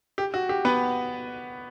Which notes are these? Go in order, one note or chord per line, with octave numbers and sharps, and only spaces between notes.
G4
F#4
G4
B3 B4